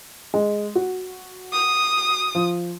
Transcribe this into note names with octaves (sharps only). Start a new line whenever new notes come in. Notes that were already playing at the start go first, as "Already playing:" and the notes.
G#3
F#4
D#6
F3